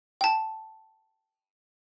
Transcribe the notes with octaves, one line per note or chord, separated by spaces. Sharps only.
G5 A5